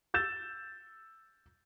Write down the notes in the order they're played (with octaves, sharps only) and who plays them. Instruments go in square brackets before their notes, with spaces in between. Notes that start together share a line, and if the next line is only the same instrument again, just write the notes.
[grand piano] E6 G6 A6 E7